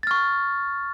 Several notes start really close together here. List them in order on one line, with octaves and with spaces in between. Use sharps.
A6 F6 C#6